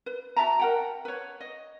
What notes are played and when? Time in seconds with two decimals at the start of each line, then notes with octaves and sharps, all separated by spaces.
0.06 B4
0.36 F#4 E5 A5 A#5
0.59 A#4 F#5 G5
1.05 B4 C#5
1.41 D#5